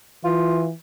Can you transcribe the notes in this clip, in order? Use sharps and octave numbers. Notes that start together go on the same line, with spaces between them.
E3 F4